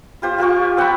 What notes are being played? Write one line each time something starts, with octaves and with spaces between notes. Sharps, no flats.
F4 G4 C5
F4 G4 A#4 C#6
C4 F#5 G5 B5